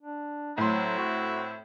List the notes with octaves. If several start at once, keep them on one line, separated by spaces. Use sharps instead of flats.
D4
A2 F#3 C4 E4 C6
F#4